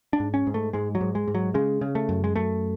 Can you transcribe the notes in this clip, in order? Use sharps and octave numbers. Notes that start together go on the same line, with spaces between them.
D4
G#2
C#4
G#2
A3
G#2 G#3
F#3
G#2
G#3
G#2
F#3
C#3 G#3
C#3
A3
F#2
G#3
F#2 A3